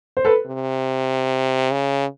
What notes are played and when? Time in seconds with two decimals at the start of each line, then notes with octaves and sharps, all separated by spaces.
0.17 C5
0.25 A4 B4
0.46 C3
1.73 C#3